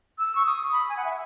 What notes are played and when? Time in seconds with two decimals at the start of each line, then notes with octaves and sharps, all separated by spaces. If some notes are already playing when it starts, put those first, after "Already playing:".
0.19 E6
0.35 C#6
0.46 D#6
0.72 B5
0.89 G#5
0.97 F#5
1.05 E5